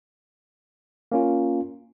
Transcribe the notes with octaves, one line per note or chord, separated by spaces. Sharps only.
A#3 C#4 F4